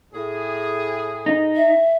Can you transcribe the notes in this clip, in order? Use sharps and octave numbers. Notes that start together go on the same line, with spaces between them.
A2 G#4
D#4
E5